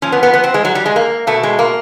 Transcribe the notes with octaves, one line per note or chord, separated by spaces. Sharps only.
A#2 F3 C#4
B3
B3
B3
C4
G#3
F#3
G3
G#3
A#3
B2 A3
G#3
A#3